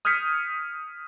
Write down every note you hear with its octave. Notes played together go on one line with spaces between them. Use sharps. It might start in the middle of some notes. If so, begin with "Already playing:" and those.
D#6 F6 G6 G#6 B6 C#7